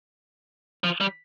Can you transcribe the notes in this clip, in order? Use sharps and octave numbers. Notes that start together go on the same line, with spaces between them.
F3
G3